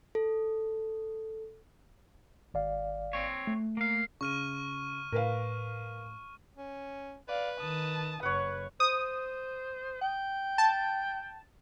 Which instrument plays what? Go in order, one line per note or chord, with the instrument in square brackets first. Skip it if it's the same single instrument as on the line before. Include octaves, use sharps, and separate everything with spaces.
[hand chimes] A4
[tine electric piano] G#1 D5 F5
[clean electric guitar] C4 C#5
[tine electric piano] A3
[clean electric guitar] A#3 F5
[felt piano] C#3 [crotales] C#6 F6 D#7
[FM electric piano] A2 [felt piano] A#4 B4 F5
[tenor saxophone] C#4
[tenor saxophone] B4 [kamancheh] D5 F5
[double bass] D#3 [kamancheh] A5 D#6
[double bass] F#1 [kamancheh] B4 [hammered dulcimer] C#5 F#5
[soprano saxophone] C5 [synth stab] D#6
[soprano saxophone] G5
[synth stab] A5